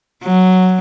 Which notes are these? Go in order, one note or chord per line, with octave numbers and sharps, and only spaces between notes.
F#3